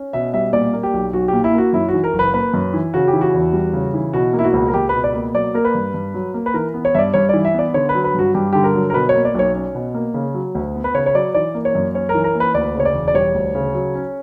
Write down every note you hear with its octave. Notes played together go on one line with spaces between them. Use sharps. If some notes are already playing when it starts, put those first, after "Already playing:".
Already playing: C#4
B2 E5
G3 E5
A#2 D5
A#3
G4
B1
B1 F#4
A#2 G4
E4
A#3 F#4
F#2 E4
E3 F#4
A#4
F#1
B4
A#3 B4
F#2
E3
C#3 F#4
G4
E3
F#4
E2
G3
C#3
E3
B2 F#4
A#3
E4
F#4
C#2
A#4
C#2 G4
B2 B4
D5
A#3
F#3 D5
A#3 A#4
B4
G2
G2
F#3
A#3
B4
E3 A#4
B3
C#5
G2 D5 E5
G2 C#5
E3 D5
E5
B3 D5
D3 C#5
B4
F#3
B4
G2 F#4
G2 G4
D3 G4
A#4
F#3
A#4
B2 B4
C#5
A#3
D5
B1 C#5
C#4
B2
A#3
C#3
F#3
D2
B3
B4
C#3 C#5
C#5
F#3 D5
E3 D5
A#3
C#5
F#2
C#4 C#5
A#4
E3
A#4
A#3
B4
D2 D5
C#3 C#5
D5
E1
D5
G3 C#5
D2
C#3
F#3
C#4